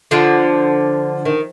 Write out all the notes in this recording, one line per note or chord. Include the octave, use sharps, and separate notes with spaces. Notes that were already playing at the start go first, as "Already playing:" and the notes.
D3 F3
D#3